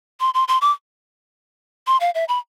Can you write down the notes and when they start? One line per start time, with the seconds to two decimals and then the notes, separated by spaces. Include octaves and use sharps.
0.20 C6
0.34 C6
0.48 C6
0.61 D6
1.87 C6
2.01 F5
2.15 E5
2.29 B5